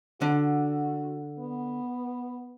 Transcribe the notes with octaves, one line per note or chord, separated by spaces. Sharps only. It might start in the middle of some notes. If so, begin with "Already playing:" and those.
D3 F#4
B3